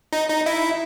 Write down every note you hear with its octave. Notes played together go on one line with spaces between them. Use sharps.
D#4
D#4
E4